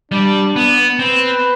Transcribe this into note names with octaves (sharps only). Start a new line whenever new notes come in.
G3 D4
B3
C4 B4